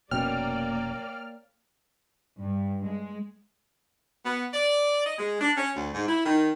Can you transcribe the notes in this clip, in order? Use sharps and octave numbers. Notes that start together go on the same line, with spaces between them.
F1 B2 A#3 C#4 C#5 D5 G5 F6
G2
G#3
B3
D5
D#5
G#3
D4
C#4
D2
G#2
E4
D#3